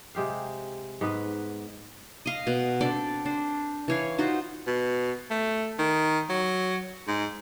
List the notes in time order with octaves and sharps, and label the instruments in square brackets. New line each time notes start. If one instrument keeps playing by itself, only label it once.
[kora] C3 G#3 G4 F5
G#2 B3 B4
[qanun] D#5 F5
B2 F#5
C4 D4 A4 D5
D4 C5
E3 C#5 F5
D#4 F4 F#4 C5
[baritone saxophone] B2
A3
D#3
F#3
G#2